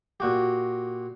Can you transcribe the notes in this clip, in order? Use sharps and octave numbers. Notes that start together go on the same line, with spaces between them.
A#2 F#4 G4